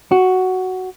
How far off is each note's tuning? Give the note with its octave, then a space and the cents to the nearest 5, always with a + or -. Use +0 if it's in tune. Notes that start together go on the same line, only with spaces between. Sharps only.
F#4 +5